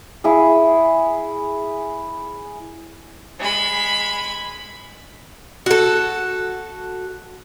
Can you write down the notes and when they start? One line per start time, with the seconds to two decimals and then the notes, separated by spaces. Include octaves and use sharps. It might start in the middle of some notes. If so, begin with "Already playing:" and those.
0.24 E4 G#4
3.40 G#3 B5
5.66 F#4 A4